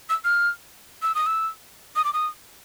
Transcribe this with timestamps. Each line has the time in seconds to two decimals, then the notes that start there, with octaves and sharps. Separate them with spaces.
0.09 E6
0.24 F6
1.02 E6
1.15 D#6
1.26 E6
1.96 D#6
2.04 D6
2.13 D#6